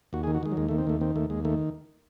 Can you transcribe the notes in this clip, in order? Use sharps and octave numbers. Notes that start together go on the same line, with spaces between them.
D#2 F#4
G#4
D#3
F#4
D#3 G#3
F#3
D#2 G#3
D#3 A3
C4
D#2 A3
D#3 C4
D#2 A3
D#2 G#3
D#3 A3